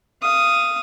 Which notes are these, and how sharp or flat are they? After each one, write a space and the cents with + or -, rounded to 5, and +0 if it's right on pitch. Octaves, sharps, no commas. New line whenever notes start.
F5 -20 D#6 +0